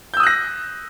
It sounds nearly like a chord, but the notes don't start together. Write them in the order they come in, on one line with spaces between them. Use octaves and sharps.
G6 E6 D#6 F#6 A#6